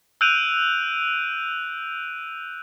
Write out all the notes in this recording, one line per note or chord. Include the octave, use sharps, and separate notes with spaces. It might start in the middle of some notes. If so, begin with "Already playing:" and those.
E6 F#6 G6 D7 D#7 F7